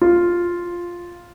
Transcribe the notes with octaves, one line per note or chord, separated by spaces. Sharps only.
F4